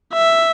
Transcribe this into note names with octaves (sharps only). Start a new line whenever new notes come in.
E5